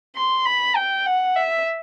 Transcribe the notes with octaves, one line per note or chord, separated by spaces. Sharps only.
C6
B5
G5
F#5
E5